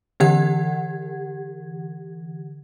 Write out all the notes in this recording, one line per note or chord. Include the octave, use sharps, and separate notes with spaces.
D3 E3 G4 F#5 G#6